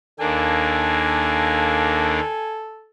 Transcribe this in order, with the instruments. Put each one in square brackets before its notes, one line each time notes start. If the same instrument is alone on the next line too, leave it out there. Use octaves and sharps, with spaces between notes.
[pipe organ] D#2 A#3 D4 [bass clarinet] A4 [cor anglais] G#5